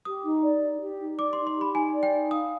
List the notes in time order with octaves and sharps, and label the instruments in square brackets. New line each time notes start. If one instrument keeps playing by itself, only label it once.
[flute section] G4 [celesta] D#6
[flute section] D#4
D5
D#4
G4
D#4
[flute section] D5 [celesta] D6
[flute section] D#4 [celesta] C6
[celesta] C6
[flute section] G4 [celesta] B5
[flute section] D#4 [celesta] G#5
[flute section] D5
[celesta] G5
[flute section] D#4
[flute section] F5 [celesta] D#6